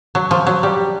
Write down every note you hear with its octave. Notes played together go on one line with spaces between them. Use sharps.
F#3
F3
F#3
G3